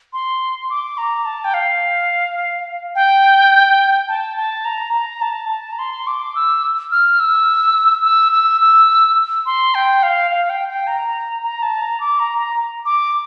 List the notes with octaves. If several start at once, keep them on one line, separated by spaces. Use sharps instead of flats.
C6
D6
A#5
A5
G5
F5
G5
A5
A5
A#5
A#5
A5
A5
A#5
C6
D6
E6
F6
E6
E6
E6
E6
C6
G5
F5
F5
G5
G5
A#5
A#5
A5
A#5
D6
A#5
A#5
D6